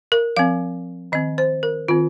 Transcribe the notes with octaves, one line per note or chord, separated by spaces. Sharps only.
A#4
F3 C4 F5
D#3 C4 D#5
C5
A#4
D#3 C4 F4